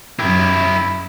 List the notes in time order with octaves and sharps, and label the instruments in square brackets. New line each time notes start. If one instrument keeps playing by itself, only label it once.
[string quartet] F#2 [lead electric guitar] E4 G4